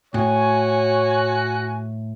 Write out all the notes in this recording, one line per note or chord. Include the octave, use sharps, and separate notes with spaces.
A2 F#4 C#5 G#5